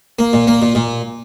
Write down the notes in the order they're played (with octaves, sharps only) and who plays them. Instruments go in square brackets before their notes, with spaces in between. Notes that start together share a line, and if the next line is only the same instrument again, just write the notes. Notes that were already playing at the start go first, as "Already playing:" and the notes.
[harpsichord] A#3
A#2
A#3
A#2
A#2